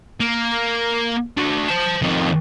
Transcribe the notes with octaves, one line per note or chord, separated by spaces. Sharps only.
A#3
D4 F#4
C5 A5
F2 D#3